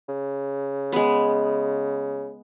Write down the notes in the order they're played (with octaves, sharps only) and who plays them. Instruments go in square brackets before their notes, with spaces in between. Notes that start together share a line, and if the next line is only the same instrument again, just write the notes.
[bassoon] C#3
[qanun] G#3 B3